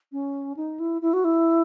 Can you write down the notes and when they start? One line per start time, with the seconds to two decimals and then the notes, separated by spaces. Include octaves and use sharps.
0.12 C#4
0.57 D#4
0.80 E4
1.02 E4
1.13 F#4
1.25 E4